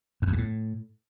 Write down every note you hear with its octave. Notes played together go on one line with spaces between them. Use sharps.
F#2
E2
G2
A2